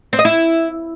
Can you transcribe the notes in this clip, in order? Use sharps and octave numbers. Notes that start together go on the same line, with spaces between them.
C4
D#5
E4